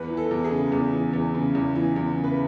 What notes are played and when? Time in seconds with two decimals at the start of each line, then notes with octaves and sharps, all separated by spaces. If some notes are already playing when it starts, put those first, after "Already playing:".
Already playing: E2 B4
0.10 E3
0.17 A4
0.31 E2
0.44 G#4
0.52 C#3
0.72 E2
0.93 E3
1.13 E2
1.35 C#3
1.55 E2
1.75 E3
1.96 E2
2.17 C#3
2.24 B4